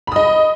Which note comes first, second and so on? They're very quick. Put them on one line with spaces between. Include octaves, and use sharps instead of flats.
B5 D#6 D#5